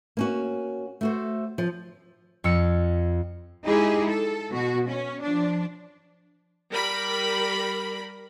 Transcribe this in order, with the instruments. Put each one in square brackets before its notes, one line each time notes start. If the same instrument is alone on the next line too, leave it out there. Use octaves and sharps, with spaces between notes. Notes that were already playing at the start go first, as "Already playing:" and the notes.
[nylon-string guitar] A#3 C#4 F#4
A3 F#4 C5
F3
[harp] F2 E6 C#7
[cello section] G#3 D#4 E4 G4 G#4
A4
B2 F#4
C#4
F3 D4
[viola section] G3 A#4 B5